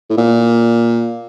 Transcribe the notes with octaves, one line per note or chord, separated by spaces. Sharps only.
A2
A#2